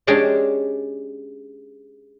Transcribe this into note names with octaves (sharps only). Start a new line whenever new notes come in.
G#3 C#4 D4 G4 G#4 D5